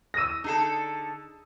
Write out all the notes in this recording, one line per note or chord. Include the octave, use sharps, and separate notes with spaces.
D#6 E6 A#6 D#7
D3 D#4 G#4 A4 A5